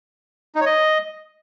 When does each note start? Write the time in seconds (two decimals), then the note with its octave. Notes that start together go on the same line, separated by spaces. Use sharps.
0.55 D#4
0.61 C#5
0.66 D#5